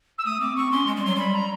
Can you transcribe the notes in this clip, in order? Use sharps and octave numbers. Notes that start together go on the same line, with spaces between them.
E6
A3 D#6
C4 D6
C4 C#6
C#4 C6
G#3
G3
F#3 C6
G3 B5
A#5